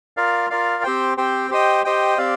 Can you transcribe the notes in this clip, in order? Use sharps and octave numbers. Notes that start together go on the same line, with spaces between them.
F4 A#4 D5 F5
F4 A#4 D5 F5
C4 G4 C5 G5
C4 G4 C5 G5
G4 C5 D#5 G5
G4 C5 D#5 G5
C4 G4 D5 F5